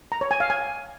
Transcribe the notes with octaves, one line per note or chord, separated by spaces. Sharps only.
A#5
C#5
G#5
F5
G#5